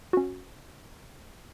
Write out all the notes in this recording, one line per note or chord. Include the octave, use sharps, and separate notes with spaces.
C#4 F#4